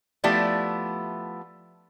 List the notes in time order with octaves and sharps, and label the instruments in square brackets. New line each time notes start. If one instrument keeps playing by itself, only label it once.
[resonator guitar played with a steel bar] F3 A3 B3 E4 G4 D5